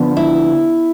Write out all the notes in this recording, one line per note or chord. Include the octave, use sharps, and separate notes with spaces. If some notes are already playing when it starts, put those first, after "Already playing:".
Already playing: D3 F3 B3
E4